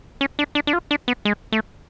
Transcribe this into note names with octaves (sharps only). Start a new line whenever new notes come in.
C#4
D4
D4
D4
F4
D4
B3
G#3
A3